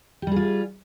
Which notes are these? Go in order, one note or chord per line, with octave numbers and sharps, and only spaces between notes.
G3 F4 G4 G#4